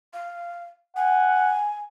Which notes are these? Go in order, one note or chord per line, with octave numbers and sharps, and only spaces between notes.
F5
F#5 G#5